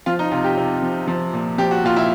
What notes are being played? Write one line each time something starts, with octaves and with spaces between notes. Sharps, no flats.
F3 F4
D#4
C3 F4
G4
C3
F3
F3
A#2
F3 G4
F#4
A#2 F4
E4